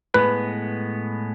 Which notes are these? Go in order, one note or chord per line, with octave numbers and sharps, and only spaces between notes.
A2 G#3 B3 B4